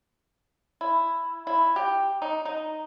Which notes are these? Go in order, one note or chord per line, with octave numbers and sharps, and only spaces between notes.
E4
E4
G4
D#4
D#4